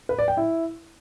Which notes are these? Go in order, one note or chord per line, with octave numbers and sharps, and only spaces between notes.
B4
D5
G5
E4